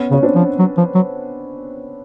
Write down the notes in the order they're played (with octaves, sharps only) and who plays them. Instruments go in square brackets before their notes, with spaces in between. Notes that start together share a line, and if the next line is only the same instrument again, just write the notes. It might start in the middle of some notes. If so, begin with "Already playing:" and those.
Already playing: [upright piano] B3 C#4
[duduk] C#3
[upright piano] C#4
C4 D4
[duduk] F3
F#3
F3
F#3